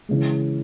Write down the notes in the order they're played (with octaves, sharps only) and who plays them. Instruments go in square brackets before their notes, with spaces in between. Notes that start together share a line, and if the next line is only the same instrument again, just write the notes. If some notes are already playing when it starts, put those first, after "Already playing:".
[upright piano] C#3 E3 G#3